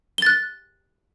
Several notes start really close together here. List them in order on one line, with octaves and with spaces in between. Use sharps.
G7 A6 F#6